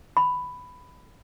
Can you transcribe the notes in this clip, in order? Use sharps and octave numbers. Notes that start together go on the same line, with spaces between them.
B5